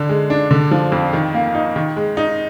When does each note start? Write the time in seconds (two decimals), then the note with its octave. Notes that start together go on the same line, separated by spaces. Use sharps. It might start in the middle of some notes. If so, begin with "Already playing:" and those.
Already playing: D3
0.09 G#3
0.30 D4
0.51 D3
0.71 F3
0.92 F2
1.13 D#3
1.34 A#3
1.54 D#4
1.76 D#3
1.96 G#3
2.17 D#4